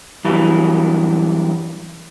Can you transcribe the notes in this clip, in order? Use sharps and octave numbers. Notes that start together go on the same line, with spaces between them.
F#2 E3 G3